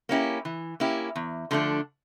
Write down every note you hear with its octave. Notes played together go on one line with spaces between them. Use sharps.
A#3 C#4 E4 G4
E3
A#3 C#4 E4 G4
E2
D3 F3 A3 D4